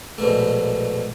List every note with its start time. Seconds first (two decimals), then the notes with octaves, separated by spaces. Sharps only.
0.18 A#1 G#2 B2 A3